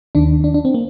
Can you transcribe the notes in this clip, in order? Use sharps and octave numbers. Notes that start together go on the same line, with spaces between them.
D#2 D#3 D4
D4
D4
C4
A#3